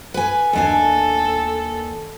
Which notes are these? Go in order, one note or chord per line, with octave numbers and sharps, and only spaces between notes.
B4 G#5
D#2 D4 A4 G#5